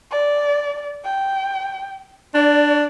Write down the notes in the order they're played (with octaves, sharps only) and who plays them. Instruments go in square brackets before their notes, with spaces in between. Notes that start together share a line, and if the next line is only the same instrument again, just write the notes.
[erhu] D5
G5
[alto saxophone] D4 [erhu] D5